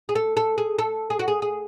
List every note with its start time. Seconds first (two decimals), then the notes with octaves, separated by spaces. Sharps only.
0.09 G#4
0.15 A4
0.37 A4
0.58 G#4
0.79 A4
1.10 G#4
1.19 F#4
1.28 G#4
1.42 G#4